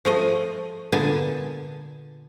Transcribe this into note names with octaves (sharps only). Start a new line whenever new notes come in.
F3 A3 D#5
A#2 D3 B3 G#5 A5